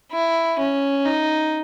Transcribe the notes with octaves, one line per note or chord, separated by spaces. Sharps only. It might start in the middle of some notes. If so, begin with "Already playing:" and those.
E4
C#4
D#4